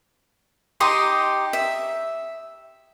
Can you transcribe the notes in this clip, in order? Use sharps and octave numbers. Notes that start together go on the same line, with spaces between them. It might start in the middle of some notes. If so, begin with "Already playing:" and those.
D#4 G4 C6 D#6
E5